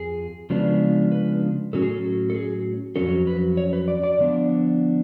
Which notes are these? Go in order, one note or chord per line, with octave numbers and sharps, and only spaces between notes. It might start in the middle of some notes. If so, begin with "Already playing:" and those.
Already playing: F2 F3 G#4
C#3 F3 G#3 B3 D4
B4
A2 F#3 C#4 A4
G#4
A4
A4
G#4
F2 C#3 F#3 C#4 A4
B4
C#5
B4
D5
D5
D3 F3 B3 D4